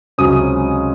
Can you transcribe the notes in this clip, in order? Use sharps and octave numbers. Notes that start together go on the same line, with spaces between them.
C#2 C3 F#3 C#4 D#6